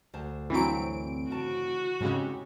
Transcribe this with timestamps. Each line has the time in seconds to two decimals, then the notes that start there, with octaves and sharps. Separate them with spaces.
0.14 D2 C5 A5
0.50 G2 E3 F#3 C4 D7
1.31 C#3 F#4 A5
2.00 G#2 C#3 G#3 C4 G4